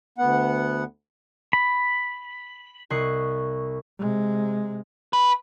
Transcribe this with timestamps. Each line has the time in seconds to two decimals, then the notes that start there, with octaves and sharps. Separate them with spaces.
0.18 D2 B3 F#5
1.53 B5
2.90 C2 D#5 C#6 F#6 C7
3.99 C3 G#3
5.13 B4